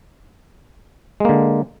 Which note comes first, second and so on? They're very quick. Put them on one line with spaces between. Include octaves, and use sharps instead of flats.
G#3 A#3 D3